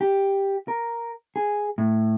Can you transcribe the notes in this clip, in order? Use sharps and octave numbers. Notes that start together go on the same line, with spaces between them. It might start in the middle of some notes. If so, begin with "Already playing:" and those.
G4
A#4
G#4
A2